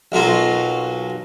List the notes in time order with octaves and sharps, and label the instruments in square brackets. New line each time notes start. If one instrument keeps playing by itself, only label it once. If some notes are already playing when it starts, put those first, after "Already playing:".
[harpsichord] B1 B2 F#3 A#3 F4